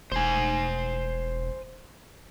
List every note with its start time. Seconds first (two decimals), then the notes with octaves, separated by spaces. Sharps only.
0.12 E1 C5 G#5